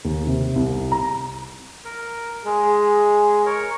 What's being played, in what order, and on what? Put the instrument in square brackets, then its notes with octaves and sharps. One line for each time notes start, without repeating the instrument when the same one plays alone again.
[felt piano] D#2
C3
C2
A#5
[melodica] A#4
[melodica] G#3 [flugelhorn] G#4
[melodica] A#4 C#5